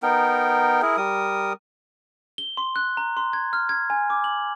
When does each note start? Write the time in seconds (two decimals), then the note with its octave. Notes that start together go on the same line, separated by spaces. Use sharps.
0.03 B3 D#4 A#4 G5
0.82 E4 G#4 A#4
0.97 G3 A#4 D#6
2.38 G7
2.57 C6
2.76 F#6
2.97 A#5
3.17 C6
3.33 G#6
3.53 F6
3.69 G#6
3.90 G#5
4.10 D6
4.24 F#7